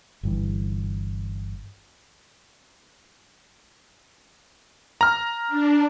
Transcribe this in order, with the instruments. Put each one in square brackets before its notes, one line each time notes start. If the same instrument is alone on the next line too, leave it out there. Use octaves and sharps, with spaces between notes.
[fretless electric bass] G1 G2 E3
[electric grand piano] A#5 F6
[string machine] D4